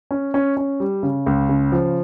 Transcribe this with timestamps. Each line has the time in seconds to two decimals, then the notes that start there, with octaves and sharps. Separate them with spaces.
0.11 C#4
0.34 C#4
0.57 C#4
0.80 G3
1.03 C#3
1.26 C#2
1.49 C#3
1.72 F3